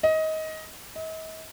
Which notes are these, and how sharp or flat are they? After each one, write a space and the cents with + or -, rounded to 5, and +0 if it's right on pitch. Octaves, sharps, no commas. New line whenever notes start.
D#5 +20
D#5 +45